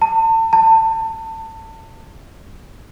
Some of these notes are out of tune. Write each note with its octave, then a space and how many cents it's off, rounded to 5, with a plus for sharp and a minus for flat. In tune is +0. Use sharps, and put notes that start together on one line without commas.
A5 +40
A5 +30